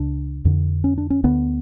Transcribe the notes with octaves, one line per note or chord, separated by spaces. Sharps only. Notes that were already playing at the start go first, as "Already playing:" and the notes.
Already playing: C#2 C#3 D4
F2 D3
C#4
D4
C#4
D2 D3 B3